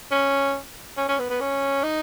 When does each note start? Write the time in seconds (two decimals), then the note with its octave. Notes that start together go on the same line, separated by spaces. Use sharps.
0.11 C#4
0.97 C#4
1.09 C#4
1.19 B3
1.30 B3
1.41 C#4
1.83 D#4